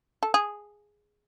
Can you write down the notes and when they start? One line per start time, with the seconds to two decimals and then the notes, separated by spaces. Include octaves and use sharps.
0.23 A4
0.34 G#4